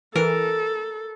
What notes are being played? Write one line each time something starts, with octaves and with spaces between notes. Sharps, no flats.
E3 A4 A#4